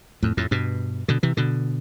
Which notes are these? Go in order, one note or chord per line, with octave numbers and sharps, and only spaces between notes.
F2 A2
F2 A2
G2 B2
B2 D3
C3 E3
B2 D3